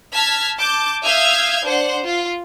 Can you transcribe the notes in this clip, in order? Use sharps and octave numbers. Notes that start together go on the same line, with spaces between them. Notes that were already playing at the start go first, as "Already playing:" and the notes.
A5 F6 G#6 B6
A5 D6 G6
E5 F5 D#6 F6 G6 G#6
D4 C5 F#5
F4